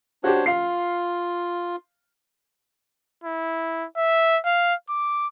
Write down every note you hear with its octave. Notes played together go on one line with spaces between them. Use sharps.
D4 F#4 G4 C5 C#5
F4 F5 C7
E4
E5
F5
D6